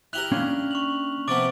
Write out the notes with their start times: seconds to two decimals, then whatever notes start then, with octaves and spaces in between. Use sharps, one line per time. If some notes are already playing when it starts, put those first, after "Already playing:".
0.13 E4 G4 A#4 F#6 F7 F#7
0.32 A#3 C#4 D4 F6
0.71 C#6 F7 F#7
1.28 C3 F3 B3 D6 A6 D7